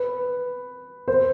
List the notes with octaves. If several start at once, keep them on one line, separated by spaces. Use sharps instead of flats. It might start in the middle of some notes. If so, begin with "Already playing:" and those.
Already playing: B4
C5